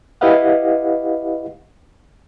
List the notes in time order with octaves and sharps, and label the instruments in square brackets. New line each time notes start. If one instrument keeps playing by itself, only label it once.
[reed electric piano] E4 G4 B4 D#5 F5 F#5